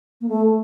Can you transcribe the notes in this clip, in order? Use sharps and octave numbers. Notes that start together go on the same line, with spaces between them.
A#3
A3